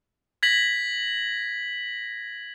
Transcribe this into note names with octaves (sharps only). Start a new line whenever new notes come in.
G#6 A#6 B6 F#7